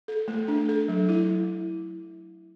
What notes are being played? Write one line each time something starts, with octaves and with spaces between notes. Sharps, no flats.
A4
A3
D4
A4
F#3
E4